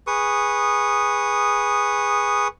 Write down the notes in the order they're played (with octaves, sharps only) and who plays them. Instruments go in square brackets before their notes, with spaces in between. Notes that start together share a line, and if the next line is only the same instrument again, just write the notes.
[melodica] G#4 B4 C#6 D#6